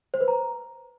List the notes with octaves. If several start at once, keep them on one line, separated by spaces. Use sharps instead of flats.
C5
B4
A#5